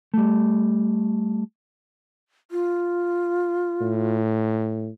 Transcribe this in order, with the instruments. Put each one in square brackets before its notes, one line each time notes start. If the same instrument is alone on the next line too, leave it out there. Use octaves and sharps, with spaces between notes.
[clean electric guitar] G3 A3
[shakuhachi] F4
[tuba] A2